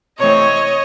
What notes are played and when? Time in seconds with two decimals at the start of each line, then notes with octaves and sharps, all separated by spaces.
0.19 C3 E3 A3 C4 C#5 D#5